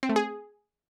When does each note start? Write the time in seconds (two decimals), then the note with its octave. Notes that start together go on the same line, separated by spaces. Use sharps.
0.03 C4
0.09 A3
0.16 G#4